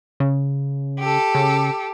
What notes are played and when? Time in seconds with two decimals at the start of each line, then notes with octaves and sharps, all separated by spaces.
0.20 C#3
1.00 G4 A4
1.35 C#3